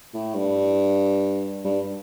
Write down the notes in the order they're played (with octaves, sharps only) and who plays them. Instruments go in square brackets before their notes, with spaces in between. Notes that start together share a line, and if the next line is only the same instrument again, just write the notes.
[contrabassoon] A2
G2
G2